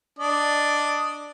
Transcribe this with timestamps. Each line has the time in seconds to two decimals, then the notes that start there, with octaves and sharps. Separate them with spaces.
0.19 D4 D#5